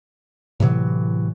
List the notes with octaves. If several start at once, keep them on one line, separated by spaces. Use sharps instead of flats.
A2 C3 E3 F#3